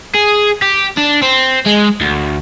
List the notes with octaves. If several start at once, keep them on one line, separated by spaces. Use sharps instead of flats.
G#4
G4
D4
C4
G#3
D2